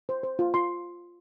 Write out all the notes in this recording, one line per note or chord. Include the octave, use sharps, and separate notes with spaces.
C5
C5
F4
F4 C6